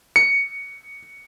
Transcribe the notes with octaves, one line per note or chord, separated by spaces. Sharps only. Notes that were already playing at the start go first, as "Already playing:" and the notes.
C#7